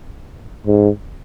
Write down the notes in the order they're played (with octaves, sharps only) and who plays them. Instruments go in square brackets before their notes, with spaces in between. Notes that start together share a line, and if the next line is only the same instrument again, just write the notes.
[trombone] G#2